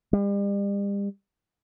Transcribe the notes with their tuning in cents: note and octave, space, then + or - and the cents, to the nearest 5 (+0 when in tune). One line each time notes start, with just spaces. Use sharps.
G3 +40